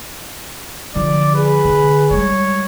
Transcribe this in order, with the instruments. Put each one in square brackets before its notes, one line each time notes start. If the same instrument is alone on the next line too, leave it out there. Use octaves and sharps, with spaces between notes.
[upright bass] D3 F3 [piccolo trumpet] D5
[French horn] G#4 [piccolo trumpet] B4
[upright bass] D3
[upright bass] G3 G#3 [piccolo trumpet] C#5